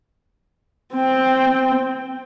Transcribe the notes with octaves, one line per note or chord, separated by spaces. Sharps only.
C4 G5